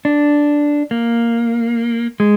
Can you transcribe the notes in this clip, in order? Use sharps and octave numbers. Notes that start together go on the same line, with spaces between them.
D4
A#3
G#3